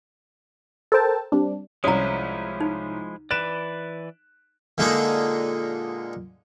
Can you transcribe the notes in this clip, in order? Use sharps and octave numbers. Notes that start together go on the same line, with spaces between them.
A4 A#4 C5 G5 A5
G3 C4 D4
C2 F3 G#3 C#4 E4 A#5 D#6
D#4
E3 B4 D5 F#6 D7 E7
A#2 D3 G#3 D#4 G#4 A4